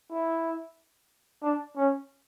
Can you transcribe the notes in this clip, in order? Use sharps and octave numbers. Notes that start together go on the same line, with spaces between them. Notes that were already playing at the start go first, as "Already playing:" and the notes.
E4
D4
C#4